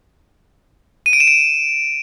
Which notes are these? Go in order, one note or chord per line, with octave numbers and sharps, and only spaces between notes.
D#7
D7
E7
D7